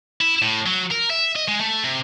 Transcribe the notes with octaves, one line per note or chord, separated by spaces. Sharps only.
E4
A2
F#3
A#4
E5
D#5
G#3
A3
C3